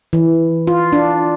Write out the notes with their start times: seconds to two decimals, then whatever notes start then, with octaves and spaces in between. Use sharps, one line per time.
0.13 E3
0.67 F4
0.93 D4